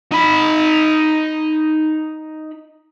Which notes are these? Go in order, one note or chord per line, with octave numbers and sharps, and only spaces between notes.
D#4 B5